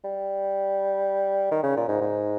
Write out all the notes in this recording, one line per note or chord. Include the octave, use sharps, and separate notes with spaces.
G3
D#3
C#3
A#2
G#2
G#2